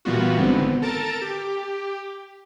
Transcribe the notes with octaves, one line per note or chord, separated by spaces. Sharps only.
A#2 E3 G3 B3 F4 F#4
G#1 G#2 D3 B3 C4
A4 A#4 A5 A6 D7
G4